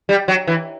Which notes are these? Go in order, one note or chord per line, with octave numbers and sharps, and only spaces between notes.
G3
F#3
E3